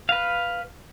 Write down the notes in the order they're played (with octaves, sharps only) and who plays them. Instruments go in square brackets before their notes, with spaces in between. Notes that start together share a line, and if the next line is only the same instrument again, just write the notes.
[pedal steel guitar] B4 F5